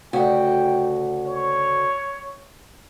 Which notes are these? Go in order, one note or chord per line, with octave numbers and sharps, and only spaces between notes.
D2 C#3 F#4 G5
C#5